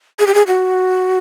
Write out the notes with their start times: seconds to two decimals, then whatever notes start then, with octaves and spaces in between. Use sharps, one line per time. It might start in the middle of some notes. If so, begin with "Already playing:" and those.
0.19 G#4
0.27 G4
0.34 G#4
0.47 F#4